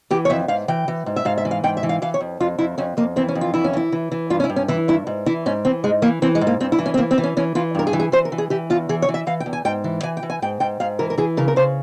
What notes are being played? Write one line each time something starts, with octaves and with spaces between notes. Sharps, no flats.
E3 G4
C#5
F2 E5
G#2 F5
E3 G5
E3
G#2
E5
G#2 F5
E5
E3
F5
G#2 G5
E5
E3
F5
E3 F5
C#5
F2
F2 F4
F2 E4
F2 C#4
F2 A#3
E3 C4
C#4
F2
F4
E3 E4
C#4
E3 E4
E3
E3
G2 F4
C#4
E4
G2
C#4
E3 E4
G2 E4
G#2
E3 E4
G#2 C#4
E3 C4
G#2 G#3
E3 A#3
E3 C4
G#3
G#2
A#3
G2 C4
E4
E3
C#4
C4
E3 A#3
C4
E3
C#4
E3 C#4
E3 F4
G2 A#4
G#4
E3
G#4
E3 C5
A#4
E3
G#4
E3 G4
E2 F4
E3 G#4
C#5
E3
E5
E3 F5
G5
E2
G#5
G#2 G5
E3
E3 G#5
G5
E3
G#5
G#2 G5
G#2 G5
G#2 F5
E3 A#4
A#4
E3 G#4
C#3 A#4
A#4
C#3 C5